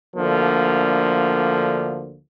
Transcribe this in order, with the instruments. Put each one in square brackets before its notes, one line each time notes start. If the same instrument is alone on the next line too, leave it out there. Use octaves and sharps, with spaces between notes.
[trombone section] D2 D3 F3 A#3